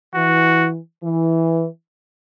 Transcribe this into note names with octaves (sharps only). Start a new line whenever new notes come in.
E3 F#4
E3